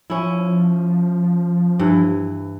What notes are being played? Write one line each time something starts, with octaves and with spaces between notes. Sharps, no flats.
F3 C#4 E4
G2 E3